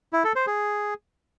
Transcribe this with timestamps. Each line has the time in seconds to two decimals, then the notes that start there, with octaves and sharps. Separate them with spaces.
0.13 E4
0.24 A4
0.35 C5
0.47 G#4